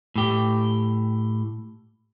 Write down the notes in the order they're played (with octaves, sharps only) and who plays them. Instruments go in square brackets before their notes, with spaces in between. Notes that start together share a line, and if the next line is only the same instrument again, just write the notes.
[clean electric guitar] A2 G4